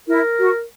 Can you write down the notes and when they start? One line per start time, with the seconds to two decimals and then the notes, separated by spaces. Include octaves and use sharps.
0.09 E4 A#4
0.39 F#4